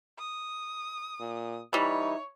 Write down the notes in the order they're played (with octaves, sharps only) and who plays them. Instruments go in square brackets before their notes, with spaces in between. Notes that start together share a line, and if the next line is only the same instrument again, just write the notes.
[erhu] D#6
[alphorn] A#2
[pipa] E3 G3 [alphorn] D#4 [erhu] C#5